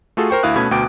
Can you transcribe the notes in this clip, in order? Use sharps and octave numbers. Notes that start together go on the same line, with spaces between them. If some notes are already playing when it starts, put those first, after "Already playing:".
A3 F4 F#4 G#4 A4
A#4 C5 G5 C#6
D2 E4 F5 D#6 F#6
B2 A3 C#4 B5 G#6
D2 B2 G5 D6 D7